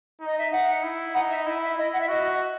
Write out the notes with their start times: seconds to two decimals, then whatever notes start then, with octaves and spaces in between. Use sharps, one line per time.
0.20 D#4
0.26 D#5
0.38 E5
0.52 D#4 F#5
0.83 E4
1.14 D#4 F#5
1.30 E5
1.46 E4 D#5
1.62 E5
1.78 E4 D#5
1.93 F#5
2.01 E5
2.09 F#4 D#5